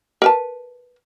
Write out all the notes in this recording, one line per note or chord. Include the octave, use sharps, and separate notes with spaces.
A#4 B4 A5